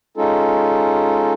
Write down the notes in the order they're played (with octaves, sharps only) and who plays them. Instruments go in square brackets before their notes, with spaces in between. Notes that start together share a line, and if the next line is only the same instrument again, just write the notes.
[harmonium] G#3 C#4 D#4 F4 A4